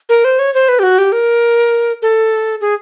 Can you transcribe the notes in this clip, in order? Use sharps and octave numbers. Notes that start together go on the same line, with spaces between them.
A#4
C5
C#5
C5
B4
G4
F#4
G4
A#4
A4
G#4